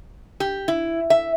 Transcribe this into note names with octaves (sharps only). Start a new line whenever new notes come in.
G4
E4
E5